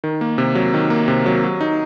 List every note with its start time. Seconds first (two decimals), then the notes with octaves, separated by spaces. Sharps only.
0.04 D#3
0.21 A#3
0.38 C3
0.55 F#3
0.74 D#3
0.90 A#3
1.08 C3
1.26 F#3
1.44 F#3
1.61 D#4